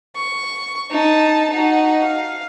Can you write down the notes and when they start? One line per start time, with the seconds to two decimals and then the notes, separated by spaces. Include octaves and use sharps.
0.15 C#6
0.91 D#4 A5
1.51 D#4 F#4
2.04 F5